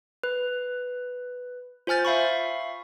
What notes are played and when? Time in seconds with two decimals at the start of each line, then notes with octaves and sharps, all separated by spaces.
0.23 B4
1.87 F4 C5 G#5 F6 A6
2.05 E5 F5 B5 C#6